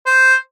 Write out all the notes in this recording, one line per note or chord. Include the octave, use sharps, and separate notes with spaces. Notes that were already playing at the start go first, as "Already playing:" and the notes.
C5